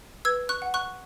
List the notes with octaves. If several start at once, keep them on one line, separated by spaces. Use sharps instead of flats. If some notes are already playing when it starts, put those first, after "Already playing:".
B4 E6 G#6
C#6 F#6
F#5
C#6 F#6